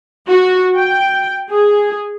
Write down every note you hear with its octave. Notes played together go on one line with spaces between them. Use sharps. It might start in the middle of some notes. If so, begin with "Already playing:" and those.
F#4
G5
G#4